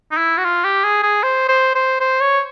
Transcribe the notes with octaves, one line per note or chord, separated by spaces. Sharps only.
D#4
E4
F#4
F4
G4
G#4
G#4
C5
C5
C5
C5
C#5